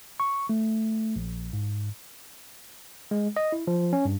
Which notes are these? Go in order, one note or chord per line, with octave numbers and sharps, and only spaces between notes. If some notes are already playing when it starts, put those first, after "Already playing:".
C#6
A3
A#1
G#2
G#3
D#5
E4
F3
C#4
G2